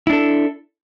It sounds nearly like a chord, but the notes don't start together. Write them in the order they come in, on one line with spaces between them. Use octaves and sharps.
E4 D4 A4